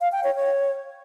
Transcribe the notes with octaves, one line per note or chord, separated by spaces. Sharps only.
F5
G5
C#5
C#5